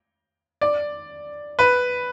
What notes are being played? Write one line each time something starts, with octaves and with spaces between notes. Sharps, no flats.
D5
B4